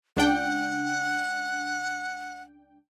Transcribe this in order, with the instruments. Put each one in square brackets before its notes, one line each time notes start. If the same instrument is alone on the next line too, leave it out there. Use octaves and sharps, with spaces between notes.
[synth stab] C#2 D4 G5 [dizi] F#5